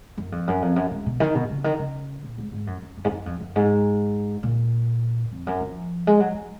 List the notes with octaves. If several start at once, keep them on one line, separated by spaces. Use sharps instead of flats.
F#2
F2
F#2
F2
F#2
G#2
B2
D#3
B2
C#3
D#3
C#3
A#2
G#2
G#2
F#2
F#2
F#2
G#2
F#2
F2
F#2
G#2
A#2
F2
F#2
F3
G#3
F#3
F#3